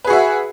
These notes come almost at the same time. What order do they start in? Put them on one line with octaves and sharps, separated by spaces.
B4 G#4 F#4 E5